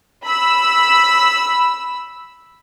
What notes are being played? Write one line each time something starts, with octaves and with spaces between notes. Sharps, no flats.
B5 E6